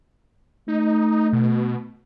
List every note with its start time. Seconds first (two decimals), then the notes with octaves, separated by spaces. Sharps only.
0.68 A3 D#4
1.33 B2